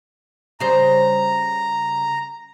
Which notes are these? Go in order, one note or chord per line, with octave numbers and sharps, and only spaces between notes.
C#3 G3 C5 A#5